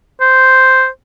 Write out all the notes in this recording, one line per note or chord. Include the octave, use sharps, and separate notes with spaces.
C5